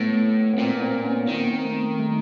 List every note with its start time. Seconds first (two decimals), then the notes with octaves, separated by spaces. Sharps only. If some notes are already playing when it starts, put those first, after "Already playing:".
Already playing: A2 A3 B3
0.54 B3
0.58 A#2 A#3 C4
0.77 B3
0.81 A#3 C4
1.05 B3 C#4
1.28 D#3 A#3 C4
1.53 C4
1.64 A3 B3
1.99 G3 A3